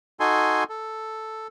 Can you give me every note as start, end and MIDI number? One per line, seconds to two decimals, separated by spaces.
0.20 0.64 63
0.20 0.64 66
0.20 0.64 69
0.20 0.64 80
0.20 0.64 84
0.69 1.47 69